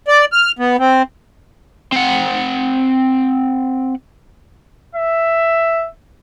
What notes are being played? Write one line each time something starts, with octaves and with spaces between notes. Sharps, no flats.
D5
F6
B3
C4
C4 F#5
E5